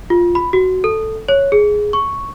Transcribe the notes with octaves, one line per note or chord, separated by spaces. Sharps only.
F4
B5
F#4
A4
C#5
G#4
C#6